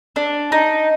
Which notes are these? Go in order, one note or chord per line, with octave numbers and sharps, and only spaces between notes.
D4
D#4